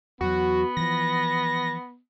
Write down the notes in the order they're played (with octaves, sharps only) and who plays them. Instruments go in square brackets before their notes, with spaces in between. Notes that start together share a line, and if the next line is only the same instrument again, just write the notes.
[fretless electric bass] E2 F#3 [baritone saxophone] B3 [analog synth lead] F#4
[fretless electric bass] E3 F3 [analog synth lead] A#6